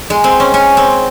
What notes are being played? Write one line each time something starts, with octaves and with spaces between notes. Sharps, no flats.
G#3
C4
C#4
C#4
C4